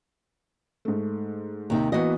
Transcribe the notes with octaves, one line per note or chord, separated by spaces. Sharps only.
G#2 A3
D#2 C3 D#4
E3 A#3 B3 F#4 D#5